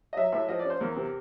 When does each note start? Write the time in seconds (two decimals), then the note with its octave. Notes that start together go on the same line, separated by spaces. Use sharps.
0.13 D#5
0.17 F#3 E5
0.32 A2 E5
0.49 F3 D#5
0.59 D5
0.65 C#4
0.70 C5
0.81 E2 A#4
0.97 C3